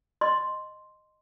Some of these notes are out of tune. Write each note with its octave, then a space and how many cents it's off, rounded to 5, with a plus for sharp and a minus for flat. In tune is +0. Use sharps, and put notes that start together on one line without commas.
D#5 -15 C6 +0